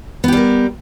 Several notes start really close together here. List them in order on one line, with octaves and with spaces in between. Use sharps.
B3 G4 G3 A#4